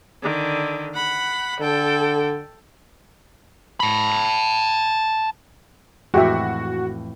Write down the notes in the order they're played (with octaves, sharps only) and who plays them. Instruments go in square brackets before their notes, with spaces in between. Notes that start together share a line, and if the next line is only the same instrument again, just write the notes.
[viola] D3 D#3
F#5 B5
[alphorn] D3 [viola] A4 G5
[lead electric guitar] A5 B5
[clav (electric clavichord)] F2 A2 E3 [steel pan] G#3 G4 E5 [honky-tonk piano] F#4